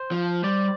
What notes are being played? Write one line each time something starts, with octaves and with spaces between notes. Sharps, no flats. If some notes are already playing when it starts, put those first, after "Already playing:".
Already playing: C5
F3
G3 D5